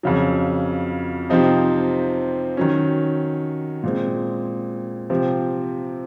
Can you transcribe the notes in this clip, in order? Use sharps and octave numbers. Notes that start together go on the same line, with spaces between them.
F2 C#3 F#3
C3 F3 C4 D#4
D#3 F#3 C#4
A#2 G#3 C4
C3 F3 C4